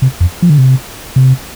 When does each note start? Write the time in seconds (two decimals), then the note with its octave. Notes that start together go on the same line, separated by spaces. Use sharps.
0.02 C3
0.20 F2
0.42 F3
0.50 D3
0.58 C3
1.16 C3